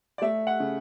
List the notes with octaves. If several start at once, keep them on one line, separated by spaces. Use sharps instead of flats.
D5
A3 E5
F#5
C#3